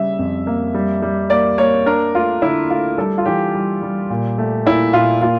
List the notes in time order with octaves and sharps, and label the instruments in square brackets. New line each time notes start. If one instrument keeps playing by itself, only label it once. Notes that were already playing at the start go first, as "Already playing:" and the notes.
Already playing: [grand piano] C#3 G3 E5
F2
A#3
G3
G3
A#3 D5
A#3 C#5
D4 A#4
A3 F4
D3 E4
A3 F4
G3 A4
F4
E3 G4
G3
G3
A#2
A3
A#2 E4
A#2 F4
A#3 F4